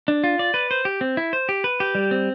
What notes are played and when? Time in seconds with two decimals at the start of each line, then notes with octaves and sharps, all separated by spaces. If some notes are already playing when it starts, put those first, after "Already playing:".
0.08 D4
0.24 F4
0.39 D5
0.54 B4
0.71 C5
0.85 G4
1.01 C4
1.17 E4
1.33 C5
1.49 G4
1.64 B4
1.80 G4
1.95 G3
2.11 C4